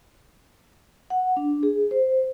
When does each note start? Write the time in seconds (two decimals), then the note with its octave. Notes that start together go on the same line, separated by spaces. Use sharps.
1.10 F#5
1.37 D4
1.63 G#4
1.91 C5